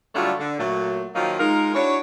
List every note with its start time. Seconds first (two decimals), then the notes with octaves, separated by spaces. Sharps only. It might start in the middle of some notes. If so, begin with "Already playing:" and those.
0.15 D3 F#3 G3 A3 D4 F4
0.40 D3
0.59 A#2 F#3 A3
1.15 D#3 F3 F#3 A#3 D#4 F4
1.40 G#3 D#4 F4 A#4
1.75 D4 E4 F#4 C#5